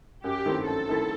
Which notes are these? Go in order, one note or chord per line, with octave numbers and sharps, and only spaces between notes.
F#2 G4
D#3 A3 C4 E4
F#2 A4
D#3 A3 C4 E4